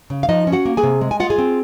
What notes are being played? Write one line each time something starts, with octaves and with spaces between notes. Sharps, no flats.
C#3
F5
F3 D#4 D#5
C#4
F#4 F#5
A#3
G#4 G#5
C3
G#3
G#5
F4 F#5
G#4 G#5
C4